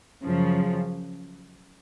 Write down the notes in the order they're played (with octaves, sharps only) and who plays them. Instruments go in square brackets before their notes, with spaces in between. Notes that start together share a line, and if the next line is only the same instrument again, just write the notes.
[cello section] F#2 C#3 F3